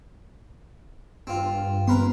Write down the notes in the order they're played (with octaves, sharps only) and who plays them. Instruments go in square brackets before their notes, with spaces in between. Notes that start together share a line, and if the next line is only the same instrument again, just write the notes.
[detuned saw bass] G2 [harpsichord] C4 F4
[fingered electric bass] B3 C4 [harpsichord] A#4 B4 C6